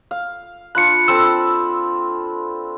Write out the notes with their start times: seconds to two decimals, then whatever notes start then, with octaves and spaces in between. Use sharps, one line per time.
0.11 F5
0.75 D4 F4 B5 F#6 C#7
1.08 C4 A4 B5 E6